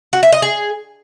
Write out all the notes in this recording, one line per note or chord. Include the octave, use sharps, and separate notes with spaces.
F#4
E5
D#5
G#4